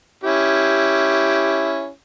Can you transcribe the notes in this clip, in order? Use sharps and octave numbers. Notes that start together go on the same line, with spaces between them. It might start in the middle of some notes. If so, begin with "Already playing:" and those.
C#4 E4 G4